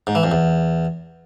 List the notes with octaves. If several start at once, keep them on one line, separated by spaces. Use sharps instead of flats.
G#2
E3
F2
E2